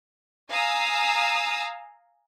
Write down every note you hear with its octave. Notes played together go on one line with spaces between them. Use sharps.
F5 G#5 A#5 D#6 E6